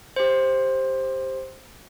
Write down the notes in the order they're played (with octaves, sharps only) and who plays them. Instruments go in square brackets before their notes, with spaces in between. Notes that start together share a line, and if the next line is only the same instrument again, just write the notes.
[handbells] G4 C5